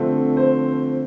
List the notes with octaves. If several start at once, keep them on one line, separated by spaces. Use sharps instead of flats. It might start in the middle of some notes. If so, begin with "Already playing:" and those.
Already playing: D3 F3 A3 C4
C5